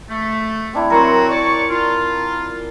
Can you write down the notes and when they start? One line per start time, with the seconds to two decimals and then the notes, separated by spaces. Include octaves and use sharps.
0.09 A3
0.73 C4 D4 E4
0.90 F#3 C4 F#4 A#4 C6
1.29 C#5 D5 C#6
1.70 F4